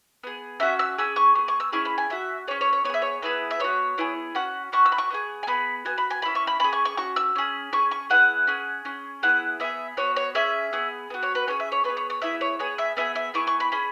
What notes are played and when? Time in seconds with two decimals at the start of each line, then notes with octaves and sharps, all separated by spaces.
0.24 B3 G#4
0.60 C#4 F#4 E5
0.79 E6
0.98 C#4 G#4 E6
1.16 C#6
1.35 B3 G#4
1.48 C#6
1.60 E6
1.72 C#4 E4 G#4 C#6
1.85 B5
1.98 G#5
2.10 C#4 F#4 E5
2.47 C#4 G#4 C#5
2.61 C#5
2.73 C#5
2.84 B3 C#5
2.89 G#4 E5
3.02 C#5
3.22 B3 E4 G#4 B4
3.51 E5
3.60 B3 F#4 C#5
3.98 B3 E4 G#4
4.35 C#4 F#4 F#5
4.72 C#4 F#4 C#6
4.85 E6
4.92 B5
4.98 C#6
5.10 B3 E4 G#4
5.43 G#5
5.47 B3 G#4 B5
5.85 B3 F#4 G#5
5.98 B5
6.10 G#5
6.22 G#4 B5
6.25 C#4 E4
6.35 C#6
6.47 B5
6.60 C#4 G#4 B5
6.73 C#6
6.85 C#6
6.97 C#4 F#4 C#6
7.16 E6
7.36 C#4 G#4
7.73 C#4 G#4 C#6
7.91 C#6
8.10 B3 E4 G#4 F#5
8.47 C#4 G#4
8.85 C#4 G#4
9.23 B3 E4 G#4 F#5
9.60 B3 E4 G#4 E5
9.97 B3 F#4 C#5
10.16 C#5
10.35 C#4 G#4 E5
10.73 B3 G#4
11.10 B3 F#4
11.23 C#5
11.35 B4
11.47 C#4 G#4 C#5
11.60 E5
11.72 C#5
11.84 B3 B4
11.89 G#4
11.97 C#5
12.10 C#5
12.22 B3 E4 G#4 E5
12.41 C#5
12.59 B3 G#4 C#5
12.78 E5
12.97 B3 E4 G#4 E5
13.15 E5
13.34 B3 E4 G#4 C#6
13.47 C#6
13.60 B5
13.72 C#4 G#4 B5